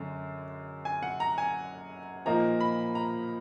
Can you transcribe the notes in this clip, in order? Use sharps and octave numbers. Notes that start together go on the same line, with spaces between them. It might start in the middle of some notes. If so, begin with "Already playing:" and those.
Already playing: F#2 D3 G#3
G#5
F#5
A#5
G#5
A#2 F3 A#3 D#4 A#5
B5
A#5